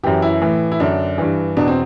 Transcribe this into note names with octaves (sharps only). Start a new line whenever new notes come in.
F#2 E3 G4
E4
A2 E3
E4
F#2 D3 D4
G2 E3
E2 B2 D4
C4